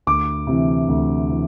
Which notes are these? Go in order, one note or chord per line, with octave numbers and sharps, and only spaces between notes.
D2 D6
C3 E3
D2
E3